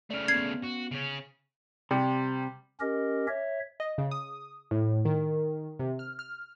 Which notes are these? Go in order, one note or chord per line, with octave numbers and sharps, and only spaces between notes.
C#3 A3 D5 F6
B3 C#4 G#6 C7
F#4
C#3 C#4
C3 G3
C#4 G4 A#4 D#5
C#5 E5
D#5
C#3
D#6
A2
D#3
C3
F6
F6